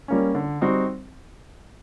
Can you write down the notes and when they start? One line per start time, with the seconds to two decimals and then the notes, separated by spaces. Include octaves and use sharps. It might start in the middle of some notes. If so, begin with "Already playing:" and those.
0.08 G3 A#3 C#4
0.35 D3
0.61 G3 C4 D#4 F#4